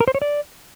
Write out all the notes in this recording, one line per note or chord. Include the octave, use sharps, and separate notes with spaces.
A#4
C5
C#5
D5